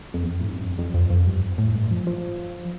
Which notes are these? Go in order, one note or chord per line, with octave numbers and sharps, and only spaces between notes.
F2
E2
F2
A2
G2
F2
F2
F2
F2
G2
A2
G2
F3
F3